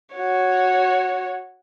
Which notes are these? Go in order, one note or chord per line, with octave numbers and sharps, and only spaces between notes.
F#4 C#5